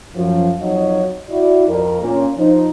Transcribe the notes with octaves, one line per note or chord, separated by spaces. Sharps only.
F#2 F3
F2 F#3 D#4 F#4 C#5 D#5
E4 F#4 D5
F2 A#4
A#2 C#4
F3 D#4 C5